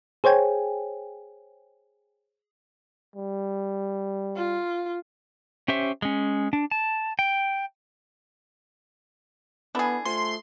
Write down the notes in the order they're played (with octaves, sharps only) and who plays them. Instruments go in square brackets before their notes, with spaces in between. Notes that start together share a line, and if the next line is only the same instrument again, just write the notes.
[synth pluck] G#4 C5 C#5 G5 G#5
[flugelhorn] G3
[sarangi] F4
[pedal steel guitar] C#4 G4 C5 E5 C#6
G#3 C#4
D4
A5
G5
[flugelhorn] B3 [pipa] D4 G#4 [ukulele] E4 A4 B5
[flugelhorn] A3 [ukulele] F4 C5 F#5 [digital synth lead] C6